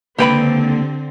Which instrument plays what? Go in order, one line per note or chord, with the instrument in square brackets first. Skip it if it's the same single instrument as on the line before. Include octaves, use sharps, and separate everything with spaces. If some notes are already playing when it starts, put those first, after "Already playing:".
[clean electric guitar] C#2 A#3 G5 [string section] D3 C4 [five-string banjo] G4 B4 B5